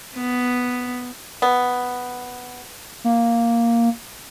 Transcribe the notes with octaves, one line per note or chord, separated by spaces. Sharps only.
B3
B3
A#3